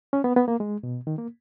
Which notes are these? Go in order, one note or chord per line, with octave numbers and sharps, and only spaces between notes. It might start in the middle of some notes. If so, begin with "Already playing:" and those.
C#4
B3
B3
A#3
G#3
B2
D#3
A#3